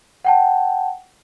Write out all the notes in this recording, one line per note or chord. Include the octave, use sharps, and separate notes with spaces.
F#5 G5 A5